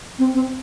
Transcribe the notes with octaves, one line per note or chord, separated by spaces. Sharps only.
C4
C4